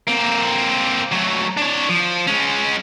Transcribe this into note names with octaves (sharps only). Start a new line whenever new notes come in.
A#3 C4
F#3 A3
D4 C#5
F3
G#3 C#4